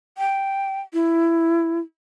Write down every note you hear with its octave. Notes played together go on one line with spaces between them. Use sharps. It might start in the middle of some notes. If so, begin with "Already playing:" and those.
G5
E4